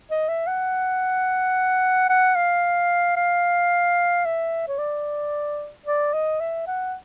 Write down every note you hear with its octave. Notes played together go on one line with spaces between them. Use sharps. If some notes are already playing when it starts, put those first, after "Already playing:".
D#5
E5
F#5
F#5
F5
F5
E5
C#5
D5
D5
D#5
E5
F#5